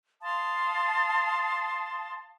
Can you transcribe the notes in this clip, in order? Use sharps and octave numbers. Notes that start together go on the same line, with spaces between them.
F5 A5 C6 D#6